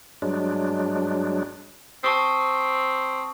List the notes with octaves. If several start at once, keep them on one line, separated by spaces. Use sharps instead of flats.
G2 F#3 G#3 D4
C4 A5 C#6 D#6